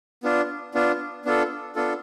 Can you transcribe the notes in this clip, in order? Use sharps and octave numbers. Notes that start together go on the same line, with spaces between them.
B3 D4 F4
B3 D4 F4
B3 D4 F4 A4
B3 D4 F4 A4